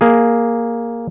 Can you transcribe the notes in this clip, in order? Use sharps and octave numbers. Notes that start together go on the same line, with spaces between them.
A#3 G#4